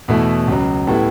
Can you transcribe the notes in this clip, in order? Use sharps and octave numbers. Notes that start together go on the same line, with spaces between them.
E2 B2 A3 E4
C#2 C#3 F#3
A2 G3 B3 E4